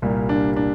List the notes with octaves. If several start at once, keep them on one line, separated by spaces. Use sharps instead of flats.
C2 A#2 G3 A#3
D4
D4